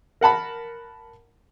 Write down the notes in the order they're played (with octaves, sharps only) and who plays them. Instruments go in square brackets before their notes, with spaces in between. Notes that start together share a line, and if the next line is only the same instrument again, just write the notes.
[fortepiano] A#4 F#5 A5 B5